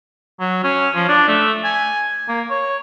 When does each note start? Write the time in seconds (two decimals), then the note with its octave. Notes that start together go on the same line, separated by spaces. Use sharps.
0.40 F#3
0.64 C#4
0.95 F3
1.09 D4
1.28 A3
1.64 G#5
2.28 A#3
2.50 C#5